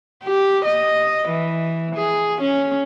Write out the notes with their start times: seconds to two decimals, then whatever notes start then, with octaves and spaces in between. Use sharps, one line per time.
0.24 G4
0.65 D#5
1.28 E3
1.95 G#4
2.41 C#4